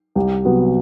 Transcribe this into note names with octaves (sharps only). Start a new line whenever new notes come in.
C2 G4
C3 F#3 B3